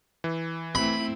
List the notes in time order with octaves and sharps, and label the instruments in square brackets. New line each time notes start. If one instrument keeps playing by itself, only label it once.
[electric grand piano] E3
[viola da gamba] A3 C4 E4 [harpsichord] B5